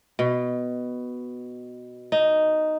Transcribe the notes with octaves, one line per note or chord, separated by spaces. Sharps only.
B2
D#4